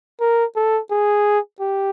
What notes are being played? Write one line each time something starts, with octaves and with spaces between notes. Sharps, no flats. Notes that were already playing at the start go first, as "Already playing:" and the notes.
A#4
A4
G#4
G4